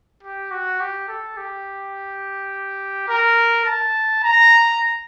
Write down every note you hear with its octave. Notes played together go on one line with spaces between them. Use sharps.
G4
F#4
G4
A4
G4
A#4
A5
A#5